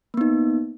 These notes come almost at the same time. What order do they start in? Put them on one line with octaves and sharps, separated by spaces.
A#3 B3 D#4